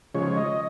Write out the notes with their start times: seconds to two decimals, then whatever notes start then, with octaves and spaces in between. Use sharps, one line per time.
0.15 C#3 F3 G#3 C#5
0.37 D#5